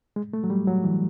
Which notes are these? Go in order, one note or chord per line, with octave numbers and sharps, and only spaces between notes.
G#3
A3
F#3
G3
F#3
E3